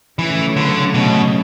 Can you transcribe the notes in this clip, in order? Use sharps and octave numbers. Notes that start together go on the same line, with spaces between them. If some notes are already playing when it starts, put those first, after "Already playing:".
C#3 E3 F#3 A3
D3
B2